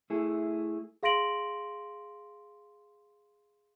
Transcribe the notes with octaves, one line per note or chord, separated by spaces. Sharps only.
A3 E4 G#4
G#4 F5 C6 A#6 D7 F#7